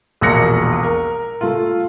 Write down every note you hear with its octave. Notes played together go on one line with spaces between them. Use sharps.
E1 A#1 A#3 F#6 A#6 C#7
A#4
A3 F4